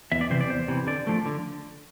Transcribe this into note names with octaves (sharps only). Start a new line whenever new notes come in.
E2 E5
D5
C3 E3 C5
D5
E2 C5
C3 E3
D3 D5
F3 A3
D3